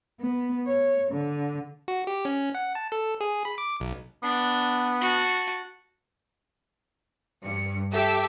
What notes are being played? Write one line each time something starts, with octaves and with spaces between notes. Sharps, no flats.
B3
C#5
D3
F#4
G4
C#4
F#5
A5
A4
G#4
B5
D6
B1
B3 D4
F#4 A5
G2 C#7
G4 A4 E5 D6